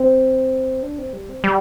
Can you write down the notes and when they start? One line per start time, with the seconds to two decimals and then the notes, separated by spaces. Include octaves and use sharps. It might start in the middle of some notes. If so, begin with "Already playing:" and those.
Already playing: C4
0.83 D4
0.98 C4
1.13 G3
1.29 C4
1.44 G3